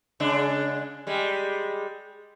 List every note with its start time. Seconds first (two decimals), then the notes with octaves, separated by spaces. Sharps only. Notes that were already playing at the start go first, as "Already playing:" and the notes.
0.20 C#3 G#3 D4
1.07 G3 G#3